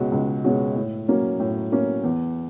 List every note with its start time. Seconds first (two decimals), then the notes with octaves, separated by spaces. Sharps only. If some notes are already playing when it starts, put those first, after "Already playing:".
Already playing: C#2 B2 G#3 C#4 F#4
0.12 C#2
0.44 B2 G#3 C#4 F#4
0.76 A2
1.08 F#3 A#3 C#4
1.39 A2
1.72 F#3 A#3 C#4
2.03 E2